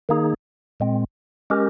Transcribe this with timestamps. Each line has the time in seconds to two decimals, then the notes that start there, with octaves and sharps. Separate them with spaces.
0.09 D#3 A#3 D#4 G#4
0.80 A#2 G#3 C4
1.50 G#3 C#4 G4 A#4